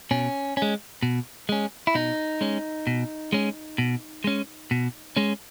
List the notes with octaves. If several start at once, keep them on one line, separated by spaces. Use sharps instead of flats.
B2 C#4
C#4
G#3
B2
G#3 C#4
E4
B2 D#4
G#3 C#4
B2
G#3 C#4
B2
G#3 C#4
B2
G#3 C#4